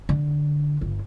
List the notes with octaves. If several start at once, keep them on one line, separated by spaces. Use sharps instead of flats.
D3
G1